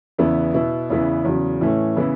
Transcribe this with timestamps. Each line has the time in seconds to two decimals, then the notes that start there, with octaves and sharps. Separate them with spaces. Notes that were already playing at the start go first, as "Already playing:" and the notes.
0.18 E2 C#3 E3 B3 E4
0.54 B2 B3 E4
0.90 E2 C#3 E3 B3 E4
1.25 E2 C#3 F#3
1.61 A2 E3 A3 C#4
1.96 C#3 E3 B3 E4